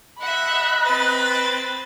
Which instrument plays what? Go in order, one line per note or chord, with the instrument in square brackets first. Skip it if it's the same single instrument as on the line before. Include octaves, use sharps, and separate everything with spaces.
[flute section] D#5 F#6 [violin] E5 F#5 [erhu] B5
[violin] C4 A6 [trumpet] B4